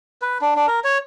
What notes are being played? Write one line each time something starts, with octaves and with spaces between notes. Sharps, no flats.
B4
D4
D4
A#4
C#5